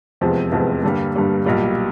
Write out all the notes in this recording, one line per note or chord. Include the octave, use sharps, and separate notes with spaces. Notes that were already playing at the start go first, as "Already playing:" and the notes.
F1 E2 C3 F3 G#3
F1 E2 C3 F3 G#3
G2 D3 G3 A#3
G2 D3 G3 A#3
B1 A#2 G3 A#3